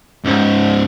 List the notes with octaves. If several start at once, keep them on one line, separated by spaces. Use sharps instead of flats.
C#2 G#2